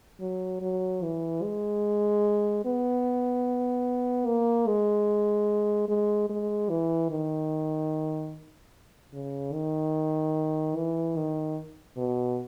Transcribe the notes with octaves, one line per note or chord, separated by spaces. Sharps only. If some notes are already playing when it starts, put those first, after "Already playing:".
F#3
F#3
E3
G#3
B3
A#3
G#3
G#3
G#3
E3
D#3
C#3
D#3
E3
D#3
B2